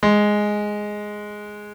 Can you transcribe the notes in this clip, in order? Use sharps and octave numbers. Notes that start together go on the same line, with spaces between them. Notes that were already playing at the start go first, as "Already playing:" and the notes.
G#3